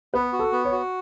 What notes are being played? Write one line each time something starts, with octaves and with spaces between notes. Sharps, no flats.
B3 B4
F#4
A4
B3
C#5
F#4